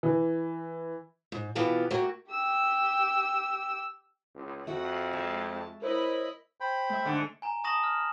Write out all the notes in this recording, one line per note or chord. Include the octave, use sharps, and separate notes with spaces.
E3
G#2
B2 E3 B3 F4 G4 A5
A3 A#3 F#4 G4
G4 E6
C#2
F2 A3 F#4 F#5 G5
G#3 E5 A5
E4 A#4 C5 C#5 D#5 B5
C5 G5 B5
A3 E5
G#2 D3
G#5 A#5
A5 C#6 D#6 A#6 E7 F#7
F6